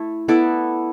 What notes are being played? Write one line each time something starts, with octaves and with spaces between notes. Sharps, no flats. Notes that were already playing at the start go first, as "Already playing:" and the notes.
Already playing: A3 E4 A4
B3 E4 A4 D5